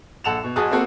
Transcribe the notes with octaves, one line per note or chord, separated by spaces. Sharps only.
A#1 A4 F#5 E7 F7
B2
B1 F#4 G#4 A5 D#6 F#6
A#3 C4 F#4 A4